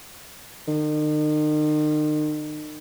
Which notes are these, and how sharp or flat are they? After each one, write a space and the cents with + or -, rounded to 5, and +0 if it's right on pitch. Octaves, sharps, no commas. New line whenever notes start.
D#3 -40